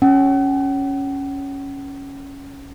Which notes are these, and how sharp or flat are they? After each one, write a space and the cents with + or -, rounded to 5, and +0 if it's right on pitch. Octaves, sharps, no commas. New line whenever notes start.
C#4 +0 F#5 +40